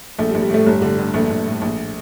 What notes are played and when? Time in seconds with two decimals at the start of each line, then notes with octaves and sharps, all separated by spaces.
0.19 A#1 A3
0.30 G3
0.35 A#1
0.42 G3
0.49 A2 A3
0.66 G1 G3
0.82 D3
0.98 G2
1.14 A#1 A3
1.30 A#1
1.46 A2
1.62 A#1